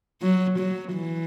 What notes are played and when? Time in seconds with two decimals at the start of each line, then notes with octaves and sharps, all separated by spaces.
0.22 F#3
0.59 F#3
0.95 E3